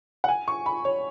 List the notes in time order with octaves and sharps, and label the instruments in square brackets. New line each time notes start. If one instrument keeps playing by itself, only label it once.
[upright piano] F#5
G#5
C#6
B5
C#5